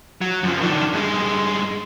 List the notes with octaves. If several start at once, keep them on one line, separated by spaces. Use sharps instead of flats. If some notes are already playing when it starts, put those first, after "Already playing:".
F#3
F#2 F3
D#3 D4
G2 G#3